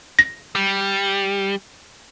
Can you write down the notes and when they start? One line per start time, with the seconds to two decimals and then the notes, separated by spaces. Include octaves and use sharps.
0.19 A#6
0.55 G3